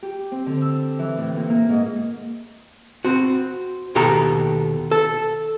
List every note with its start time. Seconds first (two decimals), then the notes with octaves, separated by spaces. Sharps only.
0.03 G4
0.32 C4
0.46 D3
0.62 E6
0.99 E3
1.17 A2
1.36 A#2
1.49 A#3
1.69 G#2
3.05 C4 F#4
3.95 D#2 B2 G4 A4 A#5
4.91 A4